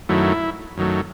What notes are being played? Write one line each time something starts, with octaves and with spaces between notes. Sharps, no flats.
F#2 D#3 F#3 A3 E4
F#2 D#3 F#3 A3